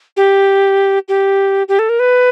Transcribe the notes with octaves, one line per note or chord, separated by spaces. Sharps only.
G4
G4
G4
A4
A#4
B4